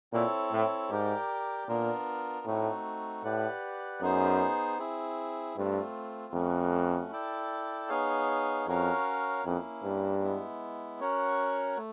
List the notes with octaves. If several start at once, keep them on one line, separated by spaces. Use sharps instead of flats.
A#2 C4 E4 A4 C#5
A2
G#2 G4 A#4 D5 G5
A#2 B3 D4 F4 A#4
A2 A3 C4 D#4 F#4
A2 G4 B4 D5 F#5
F#2 B3 D#4 G#4 C5
C4 E4 G#4
G2 A3 C4 F4
F2 A3 C#4 F#4
E4 A4 D5 G5
B3 D#4 G#4 C#5 F5
F2 C#4 F#4 A#4 C#5 F5
F2 A#3 C#4 E4
G2
G#3 B3 E4
C#4 F#4 A#4 C#5 F#5
A3